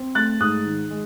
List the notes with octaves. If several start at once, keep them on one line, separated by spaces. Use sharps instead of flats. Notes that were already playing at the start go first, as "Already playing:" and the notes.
Already playing: C4
A3 F#6 A6
G#2 D#6 F#6
D#3
G#3